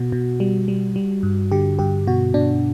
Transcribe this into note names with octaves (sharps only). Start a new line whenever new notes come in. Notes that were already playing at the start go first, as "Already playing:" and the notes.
Already playing: B2 F#4
B2
G3
G3
G3
G2
D3 G4
G2 G4
B2 F#4
B2 D4